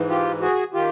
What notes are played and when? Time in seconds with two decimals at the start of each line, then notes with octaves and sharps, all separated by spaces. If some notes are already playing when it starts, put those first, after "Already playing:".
Already playing: G#2 E3
0.10 F4 G4
0.41 F#4 G#4
0.73 D#3 F4 G4